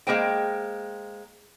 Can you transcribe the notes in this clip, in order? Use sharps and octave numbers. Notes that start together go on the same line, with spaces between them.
G#3 A#3 C5 G5